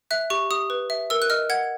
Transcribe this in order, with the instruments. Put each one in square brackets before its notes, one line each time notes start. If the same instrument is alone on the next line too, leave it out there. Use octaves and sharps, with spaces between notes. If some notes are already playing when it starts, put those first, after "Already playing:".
[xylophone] E5 F#6
G4 C#6
G4 D#6
B4
E5
A#4 E6
F#6
D#5 F6
F#5 G#6